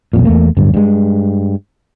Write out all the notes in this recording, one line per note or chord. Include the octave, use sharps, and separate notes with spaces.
B1 F2 A#2
E2 A3 A#3
D1 G1 G2
G2 G#3